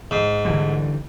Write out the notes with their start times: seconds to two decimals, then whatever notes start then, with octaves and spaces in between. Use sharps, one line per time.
0.11 G#2
0.45 D3 E3 G3